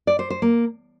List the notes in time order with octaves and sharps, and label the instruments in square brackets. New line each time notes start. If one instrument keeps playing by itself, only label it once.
[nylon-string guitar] D5
C5
C5
A#3